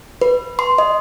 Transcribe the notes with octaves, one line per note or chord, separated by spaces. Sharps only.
B4
C6
D#5